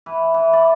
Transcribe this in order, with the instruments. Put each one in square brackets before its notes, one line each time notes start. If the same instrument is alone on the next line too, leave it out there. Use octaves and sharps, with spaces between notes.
[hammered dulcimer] E3 B4
E3
D5